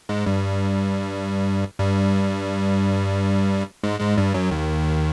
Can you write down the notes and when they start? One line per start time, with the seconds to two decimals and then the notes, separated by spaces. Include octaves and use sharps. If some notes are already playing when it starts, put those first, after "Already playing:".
0.09 G#2 G#3
0.26 G2 G3
1.79 G2 G3
3.83 G#2 G#3
4.00 G#2 G#3
4.17 G2 G3
4.34 F#2 F#3
4.51 D#2 D#3